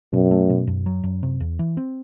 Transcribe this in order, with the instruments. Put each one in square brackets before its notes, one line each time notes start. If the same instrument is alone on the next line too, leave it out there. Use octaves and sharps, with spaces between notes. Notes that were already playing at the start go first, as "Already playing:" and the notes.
[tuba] F#2 [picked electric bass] B2
[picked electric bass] A3
B2
F#2
F#3
F#2
C3
E2
E3
C4